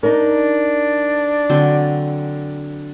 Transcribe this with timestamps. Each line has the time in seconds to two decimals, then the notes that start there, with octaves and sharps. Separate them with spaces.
0.03 D4 D#4 A#4
1.50 D3 F#3 C4